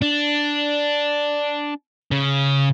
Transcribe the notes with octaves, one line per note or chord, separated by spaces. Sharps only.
D4
C#3